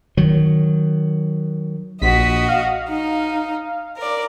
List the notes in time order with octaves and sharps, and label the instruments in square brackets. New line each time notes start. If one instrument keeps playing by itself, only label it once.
[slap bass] D#3 F#3
[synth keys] A#1 B6 [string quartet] F#4 D#5
[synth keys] F5
[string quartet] D#4
A#4 D5